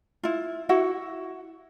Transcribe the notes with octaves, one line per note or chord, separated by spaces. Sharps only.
E4 F4
E4 F#4 F#5